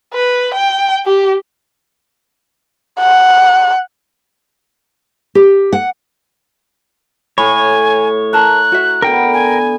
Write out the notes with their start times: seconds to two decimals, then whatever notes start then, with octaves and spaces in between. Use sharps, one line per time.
0.13 B4
0.54 G5
1.05 G4
3.01 F#5
5.35 G4
5.73 F#5
7.38 A2 C#5 G#5 B5
8.33 A#4 A5 A#5 F#6
8.72 F#4 E5
9.02 D3 B3 A#4 G5
9.33 G#5